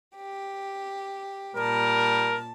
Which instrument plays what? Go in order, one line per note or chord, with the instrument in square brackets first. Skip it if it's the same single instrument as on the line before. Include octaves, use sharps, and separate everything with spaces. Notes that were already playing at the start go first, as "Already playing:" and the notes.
[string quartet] G4
[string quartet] A#2 A5 [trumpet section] G3 A#4